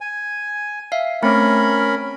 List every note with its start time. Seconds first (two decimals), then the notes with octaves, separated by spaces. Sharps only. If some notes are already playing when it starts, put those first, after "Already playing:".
0.01 G#5
0.92 E5 F5
1.23 A3 C4 C#4 A#4 B5